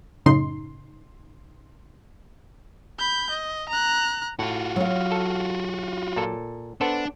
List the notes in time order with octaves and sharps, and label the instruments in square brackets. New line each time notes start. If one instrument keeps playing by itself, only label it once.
[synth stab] F#2 A2 C#3 D#4 C6
[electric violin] B5 G6
D#5
A#5 F#6
[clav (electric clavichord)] A2 [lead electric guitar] F4 F#4
[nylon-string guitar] F#3 F5
[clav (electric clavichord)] A4
A#2 A4
[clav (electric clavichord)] B3 A4 C5 [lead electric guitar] D4